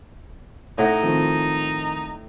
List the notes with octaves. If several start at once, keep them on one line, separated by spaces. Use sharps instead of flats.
A2 D#4 E5 F#5 A#6
D#3 F3 C4